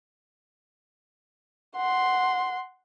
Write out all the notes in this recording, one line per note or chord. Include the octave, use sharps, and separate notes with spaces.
F#5 C6